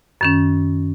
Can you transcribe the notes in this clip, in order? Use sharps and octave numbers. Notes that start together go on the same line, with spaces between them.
F#2 D#3 C#4